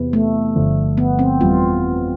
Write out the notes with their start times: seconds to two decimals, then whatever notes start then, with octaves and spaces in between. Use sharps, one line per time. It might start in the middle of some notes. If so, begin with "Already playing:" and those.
Already playing: E2 C3 E3 B3
0.13 A3
0.55 G1 G2 D3 F3
0.98 B3
1.19 C4
1.41 G1 F2 E3 G3 F4